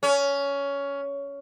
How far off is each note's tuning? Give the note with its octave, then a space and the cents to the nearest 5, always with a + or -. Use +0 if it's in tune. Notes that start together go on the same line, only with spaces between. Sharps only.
C#4 +15